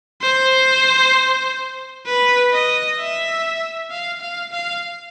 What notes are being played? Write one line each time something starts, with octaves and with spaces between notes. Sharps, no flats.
C5
B4
D#5
E5
F5
F5
F5